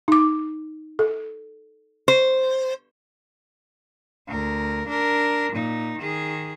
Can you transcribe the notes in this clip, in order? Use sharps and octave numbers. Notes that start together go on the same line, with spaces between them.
D#4 D6
A4
C5
D2 A#4
D4 A#4
A#2 D#4
D#3 G#4